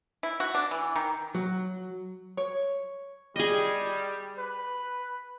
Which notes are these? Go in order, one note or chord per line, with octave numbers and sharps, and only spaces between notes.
E4
F#4
D4
E3
D#3
F#3
C#5
G3 G#4 D#5
B4